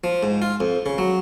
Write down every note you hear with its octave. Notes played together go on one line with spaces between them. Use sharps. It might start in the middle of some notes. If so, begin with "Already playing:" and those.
F3
G#2
F4
F2
C#3
F#3